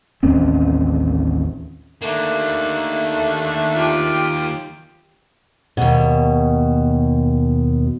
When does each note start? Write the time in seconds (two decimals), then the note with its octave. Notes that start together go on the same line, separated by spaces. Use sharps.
0.23 A1 D#2 C4 C#4
2.02 D3 D#3 A3 A#3
3.75 F4 G4
5.77 D#2 B2